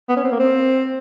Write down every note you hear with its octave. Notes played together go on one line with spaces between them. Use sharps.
B3
C#4
C4
A#3
C4